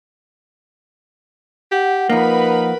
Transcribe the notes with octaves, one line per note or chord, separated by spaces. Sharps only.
G4 F#5
F3 A#3 D#4 A#4 B4 B5